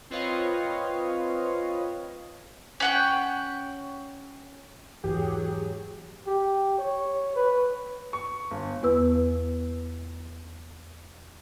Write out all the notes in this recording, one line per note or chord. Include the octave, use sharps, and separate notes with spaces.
C4 F4 B4 C#5 D#5 F5
C#4 F#5 G5
E2 G#2 E3 F#3 G4 G#4
G4
C#5
B4
C#6
G1
E2 B3 B4 E6